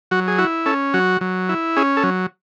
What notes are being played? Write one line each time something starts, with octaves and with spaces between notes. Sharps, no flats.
F#3 F#4
G#4
E4 F#4
C#4 A4
F#3 F#4
F#3
E4
C#4 G#4
A4
F#3